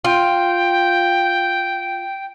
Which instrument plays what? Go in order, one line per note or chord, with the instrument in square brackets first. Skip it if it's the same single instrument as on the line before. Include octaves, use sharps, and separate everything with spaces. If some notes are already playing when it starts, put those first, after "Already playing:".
[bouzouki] F4 [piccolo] G5